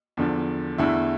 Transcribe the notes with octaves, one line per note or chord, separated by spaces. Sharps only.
E2 D3 F3
E2 D3 A3 E4